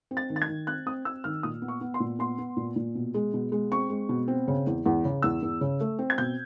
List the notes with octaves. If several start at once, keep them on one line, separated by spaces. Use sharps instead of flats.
C4
A6
D#3
A6
G#6
D#3
C4 F#6
C4 D#6
C4 E6
D#3 F6
A#2 D#6
B3
C#6
B3
C6
A#2
B3 C6
B3
A#2
A#2
B2
G#3
B2
G#3
C4 C#6
G#3
B2
C4
C#3
E2
E2
C#3
E2 E6
E2
C#3
A3
C4
G#6
B2 G6